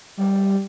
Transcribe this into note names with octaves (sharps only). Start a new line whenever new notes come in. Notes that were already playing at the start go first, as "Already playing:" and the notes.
G3